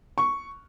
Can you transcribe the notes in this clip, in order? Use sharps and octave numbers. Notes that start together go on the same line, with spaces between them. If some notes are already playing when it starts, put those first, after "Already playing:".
C#6